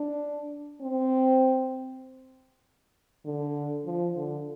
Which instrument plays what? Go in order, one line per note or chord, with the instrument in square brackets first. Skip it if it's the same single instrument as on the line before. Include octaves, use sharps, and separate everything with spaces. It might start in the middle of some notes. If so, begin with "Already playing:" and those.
Already playing: [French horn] D4
C4
D3
F3
D3